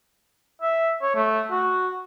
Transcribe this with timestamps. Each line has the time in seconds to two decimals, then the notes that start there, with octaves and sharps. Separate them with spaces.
0.62 E5
1.02 C#5
1.15 A3
1.51 F#4